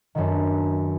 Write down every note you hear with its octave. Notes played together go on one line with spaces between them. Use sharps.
F#2 D#3 F#3 B3 D4